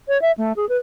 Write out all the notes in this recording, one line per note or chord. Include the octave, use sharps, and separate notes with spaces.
C#5
E5
A3
G#4
B4